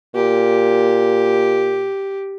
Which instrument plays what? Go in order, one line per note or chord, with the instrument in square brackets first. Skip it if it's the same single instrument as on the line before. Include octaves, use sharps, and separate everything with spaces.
[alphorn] A#2 [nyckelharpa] G4